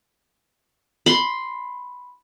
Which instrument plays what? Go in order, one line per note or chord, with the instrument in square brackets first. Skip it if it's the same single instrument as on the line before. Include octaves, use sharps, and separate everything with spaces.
[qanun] B5 C6